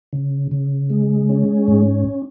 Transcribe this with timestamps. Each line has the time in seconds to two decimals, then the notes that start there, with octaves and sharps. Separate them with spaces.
0.13 C#3
0.51 C#3
0.90 G#3
1.29 C#4
1.68 G#2